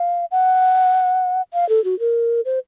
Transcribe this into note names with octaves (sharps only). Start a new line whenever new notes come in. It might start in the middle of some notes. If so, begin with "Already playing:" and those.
Already playing: F5
F#5
F5
A4
F#4
A#4
C5